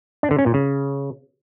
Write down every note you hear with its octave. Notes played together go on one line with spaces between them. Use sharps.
D4
D3
C#4
A#2
C#3